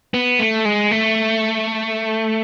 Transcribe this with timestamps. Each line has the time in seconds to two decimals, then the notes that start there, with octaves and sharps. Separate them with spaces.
0.14 B3
0.39 A3
0.65 G#3
0.91 A3